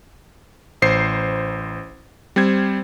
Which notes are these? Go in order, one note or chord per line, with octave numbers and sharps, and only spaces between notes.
A1 C5 C7
G3 C4 C5 G#6